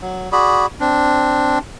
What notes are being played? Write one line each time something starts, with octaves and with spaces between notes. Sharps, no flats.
F#3
F#4 G#4 D5 B5
C4 D4